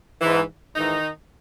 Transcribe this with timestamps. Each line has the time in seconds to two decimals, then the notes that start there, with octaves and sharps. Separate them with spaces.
0.21 G#2 E3
0.76 G#2 D#3 E3 D#4